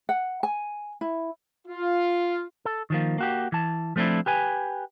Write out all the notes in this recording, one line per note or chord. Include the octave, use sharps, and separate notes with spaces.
F#5
G#5
E4
F4
A4
D#3 F3 A#3
A#3 F#4 G4
E3 A5
F3 A3 C4 D4 E4
G4 B4 G#5